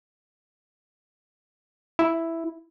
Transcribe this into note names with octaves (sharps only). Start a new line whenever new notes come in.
E4